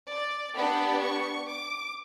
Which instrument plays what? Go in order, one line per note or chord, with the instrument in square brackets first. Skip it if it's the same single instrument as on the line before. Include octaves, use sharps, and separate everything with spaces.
[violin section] D5
B3 D4 G4 B5
C#6
D6